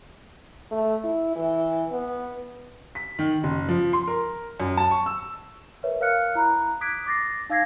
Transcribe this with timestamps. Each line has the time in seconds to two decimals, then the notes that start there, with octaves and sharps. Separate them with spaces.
0.71 A3
1.04 E4
1.36 E3
1.92 B3
2.95 B6
3.19 D#3
3.44 F#1
3.68 F3
3.93 C6
4.07 A#4
4.60 F#2
4.77 A5
4.91 C#6
5.06 E6
5.83 A#4 B4 C#5 E5
6.00 A#4 C#5 F5 F6 F#6 C#7
6.35 E4 A#5 B5 F#6
6.81 D6 D#6 F#6 G#6 B6 D7
7.07 D6 A6 A#6 C7
7.50 D#4 F5 E6 G#6 A#6 C7